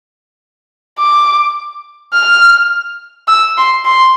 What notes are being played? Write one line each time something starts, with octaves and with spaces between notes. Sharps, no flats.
D6
F6
E6
C6
C6